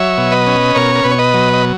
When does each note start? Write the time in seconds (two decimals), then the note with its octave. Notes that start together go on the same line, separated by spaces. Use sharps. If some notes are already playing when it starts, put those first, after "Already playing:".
Already playing: F#3 C#5 E5
0.17 B2
0.32 B4 D#5
0.47 C#4
0.75 B2 A#4 C#5
0.95 A#4
1.03 B2 B4
1.11 C#5
1.18 B4 D#5
1.34 F#3
1.53 D#5